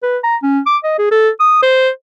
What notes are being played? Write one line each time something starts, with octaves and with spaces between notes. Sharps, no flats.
B4
A#5
C#4
D6
D#5
G#4
A4
D#6
C5